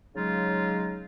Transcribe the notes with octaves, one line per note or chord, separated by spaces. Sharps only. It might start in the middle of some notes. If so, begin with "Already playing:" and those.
C#3 F#3 G#3 D#4 F4